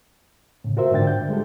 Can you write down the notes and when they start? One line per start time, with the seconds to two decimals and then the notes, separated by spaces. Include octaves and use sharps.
0.64 A2 C#3
0.77 F4 F#4 A#4 C5 E5
0.91 G#2 D3 D4 G5 A6
1.07 G6
1.29 G3 G#3 G4 A4